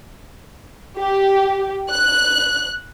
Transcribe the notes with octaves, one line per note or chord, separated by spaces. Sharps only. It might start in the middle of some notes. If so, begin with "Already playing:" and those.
G4
F#6